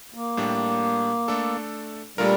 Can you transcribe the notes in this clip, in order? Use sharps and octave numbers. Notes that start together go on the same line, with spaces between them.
A#3
A2 G3 D4
A3 D4 A4
A#2 G3 A3 D4 F4 A#4